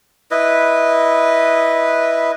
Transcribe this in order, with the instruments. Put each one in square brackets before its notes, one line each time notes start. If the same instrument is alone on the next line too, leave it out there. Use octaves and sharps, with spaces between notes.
[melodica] E4 B4 D#5